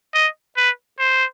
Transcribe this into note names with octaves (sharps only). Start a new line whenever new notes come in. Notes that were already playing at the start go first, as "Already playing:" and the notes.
D#5
B4
C5